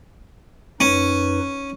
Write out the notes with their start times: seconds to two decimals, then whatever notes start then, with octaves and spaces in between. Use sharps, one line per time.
0.80 F#2 C#4 D#4 B4